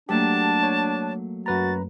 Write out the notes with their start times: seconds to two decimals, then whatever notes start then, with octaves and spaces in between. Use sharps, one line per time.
0.09 F#3 A3 A#3 D4 G4 A5
0.63 C#5
1.46 F#2 F#4 B4 A#5 A6